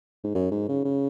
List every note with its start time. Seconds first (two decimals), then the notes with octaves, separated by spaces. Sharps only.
0.24 G#2
0.34 F#2
0.51 G#2
0.69 C#3
0.85 C#3